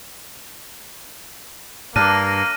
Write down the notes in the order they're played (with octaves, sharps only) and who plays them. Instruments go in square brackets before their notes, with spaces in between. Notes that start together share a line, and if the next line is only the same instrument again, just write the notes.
[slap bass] G2 [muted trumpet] A#3 [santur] D4 [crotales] F6 A#6 D#7